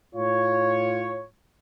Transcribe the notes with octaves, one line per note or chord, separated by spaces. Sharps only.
A2 F4 C#5